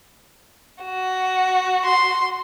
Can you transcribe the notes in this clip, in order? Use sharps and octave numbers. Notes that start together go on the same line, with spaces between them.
F#4
C6